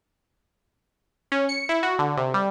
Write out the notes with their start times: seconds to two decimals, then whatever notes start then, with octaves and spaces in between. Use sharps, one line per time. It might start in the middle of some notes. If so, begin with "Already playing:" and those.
1.32 C#4
1.49 C#7
1.69 E4
1.83 F#4
1.99 D3
2.17 C3
2.34 G3